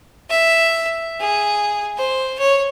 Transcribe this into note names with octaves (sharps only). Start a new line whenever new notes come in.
E5
G#4
C5
C#5